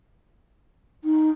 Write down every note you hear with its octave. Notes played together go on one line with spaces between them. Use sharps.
D#4